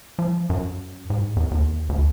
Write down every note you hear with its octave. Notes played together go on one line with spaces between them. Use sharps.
F3
F#2
G#2
E2
D#2
D2